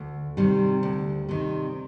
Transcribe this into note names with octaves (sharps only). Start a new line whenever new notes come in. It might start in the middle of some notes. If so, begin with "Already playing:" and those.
Already playing: D2
C3 D#3 G3
D2
C3 D#3